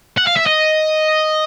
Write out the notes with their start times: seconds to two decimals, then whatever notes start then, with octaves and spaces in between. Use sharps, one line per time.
0.17 F#5
0.27 F5
0.36 E5
0.46 D#5